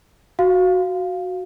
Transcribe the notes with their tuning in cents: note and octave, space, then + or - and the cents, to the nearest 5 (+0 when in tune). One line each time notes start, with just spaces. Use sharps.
F#4 +0 F5 +0